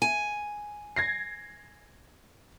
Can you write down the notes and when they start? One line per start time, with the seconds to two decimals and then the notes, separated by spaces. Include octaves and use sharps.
0.02 G#5
0.96 G#6 A#6 C7